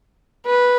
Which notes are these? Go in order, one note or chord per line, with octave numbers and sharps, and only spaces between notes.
B4